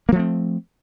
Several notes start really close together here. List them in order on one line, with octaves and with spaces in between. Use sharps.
A#3 F3 A3 C4